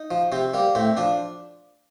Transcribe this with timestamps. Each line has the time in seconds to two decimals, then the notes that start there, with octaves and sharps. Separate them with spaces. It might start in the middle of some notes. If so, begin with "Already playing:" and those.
Already playing: D#4
0.11 F3
0.32 C3 C4
0.54 G3 A#3
0.75 A2 C4
0.97 F3 D4